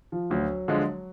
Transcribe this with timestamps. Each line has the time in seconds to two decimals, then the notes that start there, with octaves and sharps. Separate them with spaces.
0.12 F3
0.30 D2 F#3
0.68 D3 F3 G#3